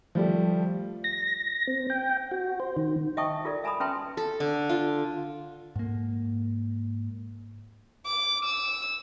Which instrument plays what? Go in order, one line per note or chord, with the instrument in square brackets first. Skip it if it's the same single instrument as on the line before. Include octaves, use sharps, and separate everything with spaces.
[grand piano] F3 G3 A3
[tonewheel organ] A#6
C4
G5
F#4
C5
D#3
[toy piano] D#5 E5 G5 A5 C#6 D#6
F4 A4 A#4 D5
E5 G#5 A#5 B5 D#6
C#4 B4 E5 G5 A5 C6
[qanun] A4
D3
F4
[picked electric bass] G#2 A#3
[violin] D6
E6